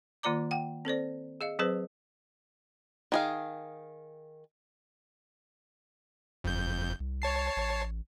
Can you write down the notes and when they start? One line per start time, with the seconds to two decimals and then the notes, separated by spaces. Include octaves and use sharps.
0.23 D#3 A#3 F4 D5 A#5 D6
0.51 F#5 G5
0.85 C4 A4 C5 D5
1.41 G#4 D#5 F5
1.59 F#3 C4 G#4 B4 C5
3.12 D#3 G#4 F5
6.44 F#1 F2 G6
7.00 C2
7.22 C#5 A5 C7
7.56 A1